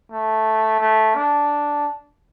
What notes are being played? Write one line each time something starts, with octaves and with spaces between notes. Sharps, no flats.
A3
A3
D4